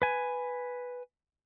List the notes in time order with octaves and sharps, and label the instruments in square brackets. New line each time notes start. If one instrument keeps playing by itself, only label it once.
[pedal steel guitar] B4 G#5